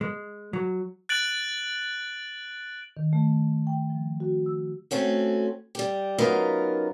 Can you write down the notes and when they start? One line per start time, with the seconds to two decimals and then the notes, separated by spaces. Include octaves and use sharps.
0.01 G#3
0.53 F#3
1.09 F#6 A6 D7 F#7
2.97 D#3
3.13 A3
3.67 G5
3.90 F3
4.20 F#4
4.46 E6
4.91 A3 C4 C#4 F#4
5.75 G3 G4
6.18 F#2 B3 D#4 F4 A#4 F5